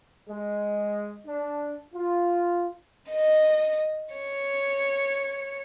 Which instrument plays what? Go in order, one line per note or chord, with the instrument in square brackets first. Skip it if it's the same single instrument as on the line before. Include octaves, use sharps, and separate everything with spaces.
[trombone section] G#3
D4
F4
[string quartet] D#5
C#5